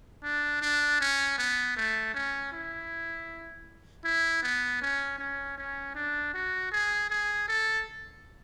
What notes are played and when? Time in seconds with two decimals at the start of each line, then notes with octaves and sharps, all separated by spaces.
0.23 D4
0.61 D4
1.01 C#4
1.38 B3
1.77 A3
2.14 C#4
2.53 E4
4.05 E4
4.43 B3
4.82 C#4
5.19 C#4
5.58 C#4
5.95 D4
6.34 F#4
6.72 G#4
7.10 G#4
7.48 A4